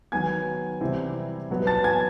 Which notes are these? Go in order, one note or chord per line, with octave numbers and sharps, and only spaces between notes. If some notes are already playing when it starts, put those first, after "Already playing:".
D#3 F#3 B3 G#5 G#6
C3 E3 G3 C4 E4
B2 F#3 B3
A5 A6
G#5 G#6